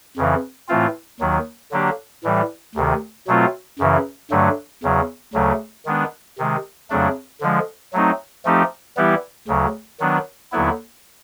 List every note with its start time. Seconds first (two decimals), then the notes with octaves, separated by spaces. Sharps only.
0.17 F2 C#3 E3
0.68 A2 E3 A3 C4 F4
1.20 D#2 D#3 F#3
1.72 D3 F#3 A#3 D4 G4
2.24 A2 E3 G3
2.75 D2 C3 D#3
3.27 B2 F#3 A3 C4 F4
3.79 F#2 C#3 E3
4.31 G2 D3 F#3 A3
4.83 E2 C#3 F#3
5.34 D2 C#3 F#3 A3
5.86 D#3 G#3 B3 D4
6.38 C3 D#3 G#3
6.90 F2 C#3 F#3 A3 D4
7.41 D3 F3 G#3
7.93 F#3 A3 C4 D#4
8.45 F3 A3 C4 D#4 G4
8.97 E3 G3 B3 E4 G4
9.48 D2 C#3 F#3
10.00 D#3 F#3 B3 D4
10.52 D#2 D3 F#3 B3 E4